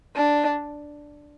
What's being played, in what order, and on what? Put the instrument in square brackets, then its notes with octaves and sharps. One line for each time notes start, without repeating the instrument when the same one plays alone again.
[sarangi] D4